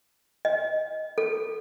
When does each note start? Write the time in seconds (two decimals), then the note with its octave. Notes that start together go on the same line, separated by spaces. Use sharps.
0.45 D#5
1.18 A4